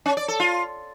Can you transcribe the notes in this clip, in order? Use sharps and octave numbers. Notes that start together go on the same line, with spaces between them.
C#4
D5
A4
F4